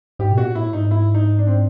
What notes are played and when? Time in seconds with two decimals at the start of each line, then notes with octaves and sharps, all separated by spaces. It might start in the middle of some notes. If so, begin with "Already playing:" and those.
0.19 G#2 G4
0.32 B2
0.38 A#2 F#4
0.55 A2 E4
0.73 G#2 D#4
0.91 E4
1.14 D#4
1.38 D4
1.47 C4